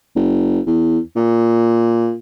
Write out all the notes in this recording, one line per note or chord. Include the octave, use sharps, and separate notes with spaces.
F#1
E2
A#2